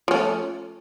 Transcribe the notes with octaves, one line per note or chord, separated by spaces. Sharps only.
F3 A3 C#4